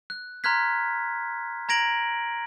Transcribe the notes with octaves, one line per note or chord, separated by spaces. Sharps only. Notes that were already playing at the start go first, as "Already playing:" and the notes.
F#6
A#5 C6 F6 F#6 G#6 B6
A#5 G#6 A#6 D7 F#7